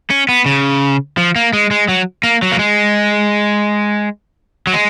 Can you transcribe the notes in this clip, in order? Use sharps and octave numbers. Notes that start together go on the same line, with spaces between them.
C#4
B3
C#3
F3
A#3
G#3
G#3
F#3
A#3
F#3
A#3
G#3
F#3
G#3